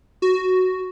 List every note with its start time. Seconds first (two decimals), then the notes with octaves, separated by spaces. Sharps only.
0.22 F#4